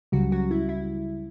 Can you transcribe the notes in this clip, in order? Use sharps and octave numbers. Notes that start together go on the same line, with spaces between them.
C#2 C#3 F#3 G3 F#4
F#3 F#4
E4
E4